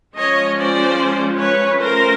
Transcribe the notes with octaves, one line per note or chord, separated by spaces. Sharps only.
F3 G#3 C#4 C#5 D#5
C5 D5
B4 C#5
F3 A3 C#4 A#4 C5